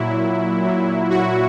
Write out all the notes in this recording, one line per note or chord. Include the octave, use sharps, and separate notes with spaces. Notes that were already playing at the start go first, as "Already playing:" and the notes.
Already playing: A#2 F#3 E4
A#2 F#3
F#4